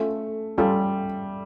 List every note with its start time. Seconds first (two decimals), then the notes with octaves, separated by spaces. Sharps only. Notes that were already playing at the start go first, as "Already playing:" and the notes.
Already playing: A3 C#4 F4 A4
0.58 G3 C#4 F4 A4